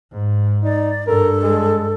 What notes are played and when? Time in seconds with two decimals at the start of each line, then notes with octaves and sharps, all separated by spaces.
0.13 G#2
0.64 D#4 D5
1.07 G2 A4 A#4
1.43 G#3